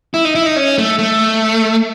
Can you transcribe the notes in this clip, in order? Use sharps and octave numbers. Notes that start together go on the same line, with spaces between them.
E4
D#4
E4
D#4
C#4
A3
A3